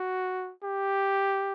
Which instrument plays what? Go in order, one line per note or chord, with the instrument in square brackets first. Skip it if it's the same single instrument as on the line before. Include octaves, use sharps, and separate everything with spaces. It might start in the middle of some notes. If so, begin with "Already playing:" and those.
Already playing: [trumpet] F#4
G4